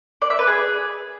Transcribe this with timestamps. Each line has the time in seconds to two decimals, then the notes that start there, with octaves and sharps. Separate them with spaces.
0.22 D5
0.30 E5
0.39 B4
0.47 G#4